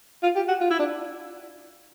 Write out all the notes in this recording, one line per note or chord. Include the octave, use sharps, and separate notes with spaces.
F4
G4
F#4
F4
E4
D4